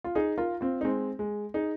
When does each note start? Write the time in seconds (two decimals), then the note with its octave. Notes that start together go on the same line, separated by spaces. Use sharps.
0.04 F4
0.15 D#4 G#4
0.38 F4 A#4
0.61 C4 F4
0.81 D#4
0.84 G#3 C4
1.19 G#3
1.54 D#4 G#4